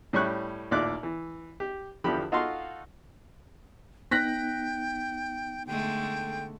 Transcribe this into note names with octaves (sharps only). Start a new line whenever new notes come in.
A2 G3 C#4 C#6 F#6
A1 D#2 A#2 D5 D6 F#6
E3
G4
E2 D3 F3 G4 B5
D#4 F4 F#4 A4 F5 C6
B3 D#4 G5 F#6 A#6 B6
D3 G#3 A3 G5